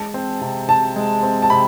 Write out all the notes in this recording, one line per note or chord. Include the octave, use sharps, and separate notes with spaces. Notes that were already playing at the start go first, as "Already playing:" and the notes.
Already playing: G#3 A5
C4
C3
C3 A5
G#3
C4
A5
C3 B5